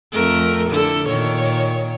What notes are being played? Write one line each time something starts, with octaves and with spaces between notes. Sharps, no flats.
F2 A3 A#4
D3 E4 A4
A#2 D#3 C#5